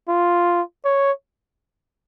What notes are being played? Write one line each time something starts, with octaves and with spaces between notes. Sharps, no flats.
F4
C#5